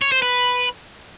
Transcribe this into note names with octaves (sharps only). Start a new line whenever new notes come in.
C#5
C5
B4